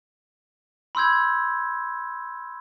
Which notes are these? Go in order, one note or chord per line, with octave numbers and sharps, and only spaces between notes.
B5 C6 E6 G6 G#6